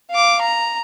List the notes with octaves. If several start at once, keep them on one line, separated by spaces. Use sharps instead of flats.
F5 D6
A#5